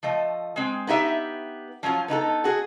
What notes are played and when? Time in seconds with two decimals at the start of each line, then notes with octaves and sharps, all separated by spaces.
0.03 F3 A3 D#5
0.56 G#3 C4
0.87 B3 D#4 G4 E5
1.83 F3 F#3 C#4 F4
2.08 B3 D#4 F4 A4
2.44 F#4 G#4